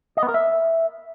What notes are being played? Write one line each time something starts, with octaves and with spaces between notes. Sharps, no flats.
D#5
B3
A#4
E5